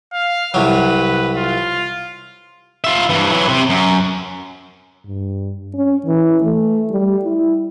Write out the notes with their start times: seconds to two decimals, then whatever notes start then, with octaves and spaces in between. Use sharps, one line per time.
0.13 F5
0.54 C2 F#3 B4
1.37 F4
2.84 F4 E5
3.09 G2 E3
3.30 E3 F#3
3.49 C3
3.70 F#2
5.06 G2
5.74 C#4
6.06 E3
6.43 A3
6.91 G3
7.24 E4